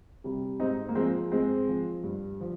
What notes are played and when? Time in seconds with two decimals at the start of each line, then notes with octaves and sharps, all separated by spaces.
0.24 C3 G3
0.60 G#2 C4 D#4
0.89 A#3
0.95 F3 G#3 C4
1.32 G#2 G#3 C4
1.69 F3
2.04 G2
2.41 F3